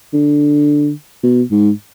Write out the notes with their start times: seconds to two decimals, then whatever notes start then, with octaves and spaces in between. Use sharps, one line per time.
0.13 D3
1.23 B2
1.51 G#2